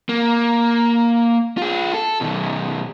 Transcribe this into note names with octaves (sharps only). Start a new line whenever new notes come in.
A#3
F4 G#4
A4
B2 D#3